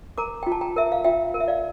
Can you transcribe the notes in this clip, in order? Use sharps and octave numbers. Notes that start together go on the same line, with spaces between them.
A#4 A#5 D6
F4 G5
A5
G5 A#5
A#4 E5
F5
F4 E5 G5
A#4
E5
D5 F5